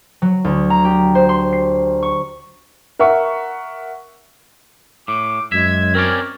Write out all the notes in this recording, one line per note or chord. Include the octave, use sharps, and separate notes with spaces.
F#3
D2
A#5
G4
C5
C6
C7
C#6
A#4 E5 F#5 C#6
A2 D6
F#2 G#3 E5 G#6
C4 C#4 A#4 D5